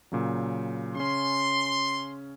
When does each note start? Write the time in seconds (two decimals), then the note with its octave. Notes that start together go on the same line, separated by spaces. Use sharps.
0.12 A#2 C#3 F#3
0.96 C#3 C#4 C6